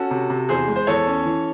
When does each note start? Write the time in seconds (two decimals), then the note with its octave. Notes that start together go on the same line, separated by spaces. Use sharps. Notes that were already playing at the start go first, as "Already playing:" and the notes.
Already playing: C#4 F#4 A4
0.11 C3
0.30 C3
0.49 E2 G#4 C5
0.68 G#3
0.76 C5
0.87 E2 A4 C#5
1.07 C#4
1.25 E3